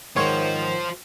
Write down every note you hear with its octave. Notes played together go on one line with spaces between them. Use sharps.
G#2 D#3 F4 C5 C#5